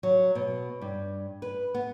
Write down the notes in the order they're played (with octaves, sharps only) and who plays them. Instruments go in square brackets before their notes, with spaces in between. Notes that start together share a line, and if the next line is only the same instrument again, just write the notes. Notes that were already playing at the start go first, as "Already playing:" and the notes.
[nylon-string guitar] F#3
B2
G2
B4
B3